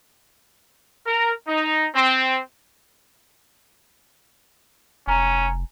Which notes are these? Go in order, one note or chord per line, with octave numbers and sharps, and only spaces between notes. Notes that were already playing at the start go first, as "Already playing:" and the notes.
A#4
D#4
C4
F1 C#4 G#5 A#5